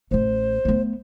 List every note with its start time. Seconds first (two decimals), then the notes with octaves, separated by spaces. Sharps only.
0.11 A1 A3 C5
0.65 A3 B3